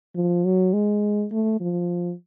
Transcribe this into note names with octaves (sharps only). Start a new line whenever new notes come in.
F3
F#3
G#3
A3
F3